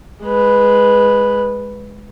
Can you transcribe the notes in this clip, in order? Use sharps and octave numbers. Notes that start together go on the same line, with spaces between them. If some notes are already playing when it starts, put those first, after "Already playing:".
G#3 B4